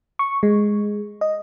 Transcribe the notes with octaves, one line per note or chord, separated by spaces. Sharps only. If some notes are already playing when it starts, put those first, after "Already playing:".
C#6
G#3
D#5